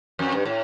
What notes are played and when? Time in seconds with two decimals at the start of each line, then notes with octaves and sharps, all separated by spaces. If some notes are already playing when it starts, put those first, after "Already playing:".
0.19 F2
0.32 G2
0.45 A2